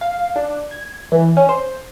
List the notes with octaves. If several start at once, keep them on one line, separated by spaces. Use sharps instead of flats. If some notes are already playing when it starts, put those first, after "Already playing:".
F5
D4
G#6
E3
C#4
C5